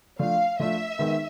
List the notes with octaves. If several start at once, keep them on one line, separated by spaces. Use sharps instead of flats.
F3 A3 D4 F4 F5
F3 A3 D4 F4 E5
D#3 G#3 B3 D#4 G#4